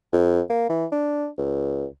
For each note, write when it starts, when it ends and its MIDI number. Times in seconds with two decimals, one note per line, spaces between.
0.13 0.41 41
0.50 0.69 58
0.69 0.86 52
0.92 1.27 62
1.38 1.86 37